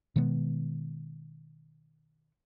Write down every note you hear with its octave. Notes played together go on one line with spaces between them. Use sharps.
B2 D#3 G#3 B3